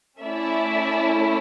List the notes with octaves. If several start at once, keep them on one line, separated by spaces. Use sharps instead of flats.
A3 C#4 E4 D5 E5